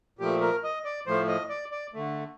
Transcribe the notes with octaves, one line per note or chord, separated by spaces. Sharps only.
A#2 F3 A3 G4
A#4
D#5
D5
A2 F3 A3 C5
D#5
D5
D5
D3 A3